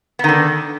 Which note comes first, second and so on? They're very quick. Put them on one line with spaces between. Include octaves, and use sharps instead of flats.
B3 D#3 D3